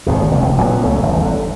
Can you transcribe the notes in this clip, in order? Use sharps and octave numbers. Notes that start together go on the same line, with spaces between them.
G#1 D#2 B2
F1 C#2 G2
A#2 F#3 A#3 B3
C#2 C#3 A3
G1 E2
D3